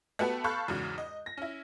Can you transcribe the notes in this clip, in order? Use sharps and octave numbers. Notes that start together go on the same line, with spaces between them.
A3 B3 F#4 G4 B4 A5
A4 F5 B5 C#6 F#6 G6
E2 G#2 C#3 F#3
D#5
A#6
C#4 E4